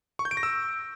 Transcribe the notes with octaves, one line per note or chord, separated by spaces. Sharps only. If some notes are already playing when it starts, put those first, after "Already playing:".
C#6
G6
D7
A#6
E6